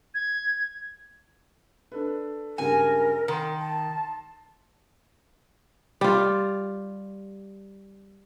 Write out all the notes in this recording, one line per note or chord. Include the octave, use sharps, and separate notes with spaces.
G#6
D4 A4 B4
C#2 G2 A#4 G#5
D#3 A#5 C6
A5
G3 F4